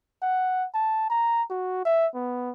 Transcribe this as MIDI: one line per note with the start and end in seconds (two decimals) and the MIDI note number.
0.22 0.66 78
0.74 1.07 81
1.10 1.43 82
1.50 1.83 66
1.85 2.07 76
2.15 2.52 59